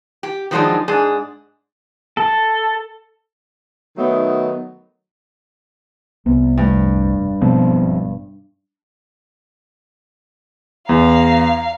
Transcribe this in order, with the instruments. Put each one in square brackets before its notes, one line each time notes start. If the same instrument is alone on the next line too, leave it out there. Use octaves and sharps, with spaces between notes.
[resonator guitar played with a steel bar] G4
D#3 F3 F#3 G#3 D4 D#4
G#2 D4 G#4
[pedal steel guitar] A4
[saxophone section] D#3 F#3 A3 B3 D#4
[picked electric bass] C2 [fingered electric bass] B3
[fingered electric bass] F1 A3 [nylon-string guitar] G2
[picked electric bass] G#1 F3 C4 [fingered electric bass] B2 G#3 B3
[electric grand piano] E2 [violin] F5 [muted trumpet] A#5